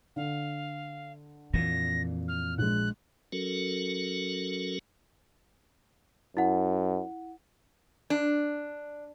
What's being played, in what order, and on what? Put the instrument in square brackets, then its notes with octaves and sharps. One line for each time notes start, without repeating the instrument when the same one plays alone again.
[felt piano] D3 [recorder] F5
[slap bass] F2 A#2 [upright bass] E3 [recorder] A#6
[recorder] F6
[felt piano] A#1 G#3 [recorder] F#6
[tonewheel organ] F#3 C#4 F#4 A4 A#4
[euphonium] F#2 [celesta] E4 F#5
[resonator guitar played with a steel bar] D4